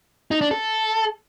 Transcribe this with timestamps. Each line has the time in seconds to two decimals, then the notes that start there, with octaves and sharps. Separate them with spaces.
0.31 D#4
0.41 D4
0.51 A4